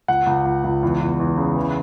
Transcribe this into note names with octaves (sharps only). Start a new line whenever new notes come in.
C#2 F#5
C#2
C#2
C#2
E2
E2
E2
C#3
E3